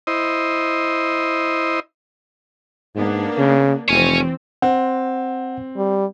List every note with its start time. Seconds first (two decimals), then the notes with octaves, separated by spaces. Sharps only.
0.07 E4 C5 D#5
2.96 G#2 A#3 B3 D4
3.38 C#3
3.88 F1 E3 C4 C#5 G#5
4.62 C4 F#5
5.77 G3